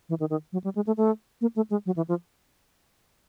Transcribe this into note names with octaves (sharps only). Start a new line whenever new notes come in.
E3
D#3
D#3
F#3
G3
G#3
A3
A3
A#3
A3
G#3
F#3
E3
F3